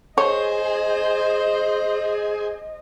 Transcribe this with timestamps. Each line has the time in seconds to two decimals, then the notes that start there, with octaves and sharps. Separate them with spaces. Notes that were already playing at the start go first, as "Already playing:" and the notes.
0.18 G#4 C5 C#5 D#5